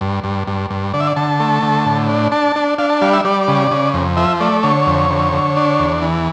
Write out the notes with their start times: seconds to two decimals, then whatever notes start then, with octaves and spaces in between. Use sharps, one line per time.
0.01 G2
0.24 G2
0.47 G2
0.70 G2
0.94 D3 D5
1.00 E5
1.07 D5
1.16 D3 A5
1.40 A3
1.63 D3
1.86 A2
2.09 D4
2.32 D4 A5
2.56 D4
2.78 D4 F5
2.90 A5
3.01 G3 F5
3.13 E5
3.25 G3 D5
3.48 C#3
3.71 C#3
3.94 F2
4.17 F3 E5
4.40 A3 D5
4.63 D3 C#5
4.87 F2
5.11 D3
5.33 D3
5.57 D4
5.79 E2
6.02 E3